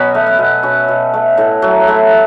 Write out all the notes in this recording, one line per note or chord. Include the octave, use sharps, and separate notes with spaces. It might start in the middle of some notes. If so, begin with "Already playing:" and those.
Already playing: B2 F#3 B3 C#4
A3
B3
B2
B2 C#4
B2
A3
A2
F#3
A2